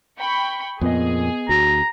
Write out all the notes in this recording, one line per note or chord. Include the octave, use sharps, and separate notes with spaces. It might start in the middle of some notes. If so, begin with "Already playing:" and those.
G5 B5 C#6
F2 A#2 B3 G#4 D#5
D2 F#4 A#5